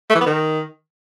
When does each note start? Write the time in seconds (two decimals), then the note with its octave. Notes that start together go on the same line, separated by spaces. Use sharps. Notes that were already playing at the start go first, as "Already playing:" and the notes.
0.10 A3
0.15 E3
0.21 B3
0.26 D#3